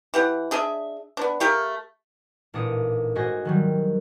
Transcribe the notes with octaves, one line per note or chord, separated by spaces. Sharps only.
E3 G4 F#5
D4 G#4 D#5 E5
B3 D4
A3 G4 A#4 F5
A1 A#2 D4 D#4 D#6 C#7
G#2 F#4 C5 D#5 G#5 A#6
D#3 F#3 G3